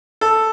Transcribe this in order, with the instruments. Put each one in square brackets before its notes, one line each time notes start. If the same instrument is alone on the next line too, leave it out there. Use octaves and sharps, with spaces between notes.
[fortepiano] A4